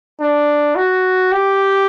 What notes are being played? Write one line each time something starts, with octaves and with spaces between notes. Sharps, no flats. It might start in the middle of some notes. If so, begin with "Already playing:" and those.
D4
F#4
G4